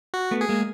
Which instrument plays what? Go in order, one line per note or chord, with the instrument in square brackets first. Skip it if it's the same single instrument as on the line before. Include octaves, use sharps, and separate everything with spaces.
[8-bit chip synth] F#4
[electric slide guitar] A3 B3
[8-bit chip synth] G#4
[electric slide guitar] G#3 A#3